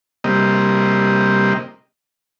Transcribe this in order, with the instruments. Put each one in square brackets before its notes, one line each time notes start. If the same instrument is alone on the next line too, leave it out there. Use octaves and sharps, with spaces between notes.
[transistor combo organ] C3 G3 A#3 D#5